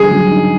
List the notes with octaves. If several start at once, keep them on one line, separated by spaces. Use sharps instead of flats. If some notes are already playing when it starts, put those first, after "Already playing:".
Already playing: D3 G3 G#4
F#3
D#4